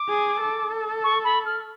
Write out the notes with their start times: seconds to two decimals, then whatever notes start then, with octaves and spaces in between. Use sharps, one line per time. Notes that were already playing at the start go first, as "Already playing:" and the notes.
Already playing: D6
0.09 G#4
0.41 A4
1.04 C#6
1.24 B5
1.46 F6